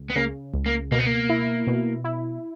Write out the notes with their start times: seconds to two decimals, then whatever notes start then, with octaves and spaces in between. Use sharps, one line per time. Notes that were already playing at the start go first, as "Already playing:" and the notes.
Already playing: C#2
0.10 B3
0.16 C#3 A#3
0.54 C#2
0.66 A#3
0.91 B2 A#3
0.98 B3
1.06 A#3
1.29 E4
1.67 B2
2.04 E4